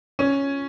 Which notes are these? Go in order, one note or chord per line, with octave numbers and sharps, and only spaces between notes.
C#4